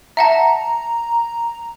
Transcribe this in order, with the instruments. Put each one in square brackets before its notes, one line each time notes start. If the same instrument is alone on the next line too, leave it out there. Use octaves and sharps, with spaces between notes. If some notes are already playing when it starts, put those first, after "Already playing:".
[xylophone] E5 F#5 A5 [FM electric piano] A#5